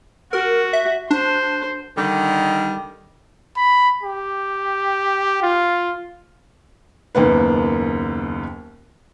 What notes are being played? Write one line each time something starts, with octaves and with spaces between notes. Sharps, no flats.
F#4 A#4
E5
D4 C5
D3 D#3 G3
B5
G4
F4
F#1 D#2 A#3 B3 B4